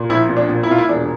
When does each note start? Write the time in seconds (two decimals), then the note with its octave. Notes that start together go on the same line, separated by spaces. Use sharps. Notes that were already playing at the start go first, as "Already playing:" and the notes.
Already playing: A#2
0.09 A#1 E4
0.29 A#2
0.37 D4
0.49 A#2
0.63 E4
0.70 A#2 F4
0.78 E4
0.89 E1 D4